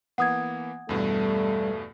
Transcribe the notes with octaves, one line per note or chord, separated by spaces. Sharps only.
E3 A#3 B3 F#5 D#6 G#6
E2 G2 B2 G3 A3